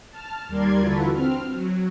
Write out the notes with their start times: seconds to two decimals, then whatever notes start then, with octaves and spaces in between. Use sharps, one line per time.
0.10 A5 F6
0.48 D#2 G3 A#4 D5 C6 G#6
0.80 D3 E3 F4 F#4 A4 B4
1.12 C4 F6
1.52 F#3